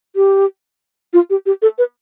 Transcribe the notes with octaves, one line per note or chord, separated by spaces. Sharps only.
G4
F4
G4
G4
A4
B4